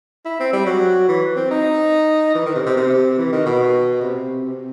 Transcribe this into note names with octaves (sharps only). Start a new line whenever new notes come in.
E4
C4
G3
F#3
E3
C4
D#4
E3
D#3
C3
C3
C3
E3
D#3
B2
C3
C3